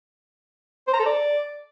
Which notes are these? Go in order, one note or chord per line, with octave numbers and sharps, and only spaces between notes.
C5
A#5
A4
D5